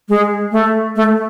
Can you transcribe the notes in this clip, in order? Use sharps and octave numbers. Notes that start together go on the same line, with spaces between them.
G#3
A3
A3